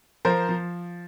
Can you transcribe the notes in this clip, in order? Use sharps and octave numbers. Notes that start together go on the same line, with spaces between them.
F3 A#4 C5
F3